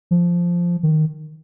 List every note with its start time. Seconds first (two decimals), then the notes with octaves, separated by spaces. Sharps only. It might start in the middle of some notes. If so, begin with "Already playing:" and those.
0.11 F3
0.83 D#3